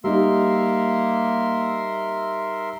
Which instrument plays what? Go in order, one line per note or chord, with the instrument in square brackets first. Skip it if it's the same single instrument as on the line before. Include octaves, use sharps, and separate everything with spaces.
[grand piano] G3 D#4 [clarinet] A#3 [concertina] A#4 E5 C6